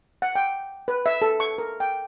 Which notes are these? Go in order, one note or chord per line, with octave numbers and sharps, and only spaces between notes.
F#5
G5
B4
E5
A4
C#6
A#4
G5